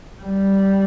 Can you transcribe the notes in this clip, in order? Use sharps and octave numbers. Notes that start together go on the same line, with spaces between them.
G3